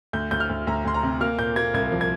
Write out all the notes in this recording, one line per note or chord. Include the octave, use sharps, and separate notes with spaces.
D2 G6
D2 G6
F6
D2
D2 A#5
D2 C6
A#5
C3
A#3 F6
A#2 G6
A#3 G#6
C2 G#6
F3
G#6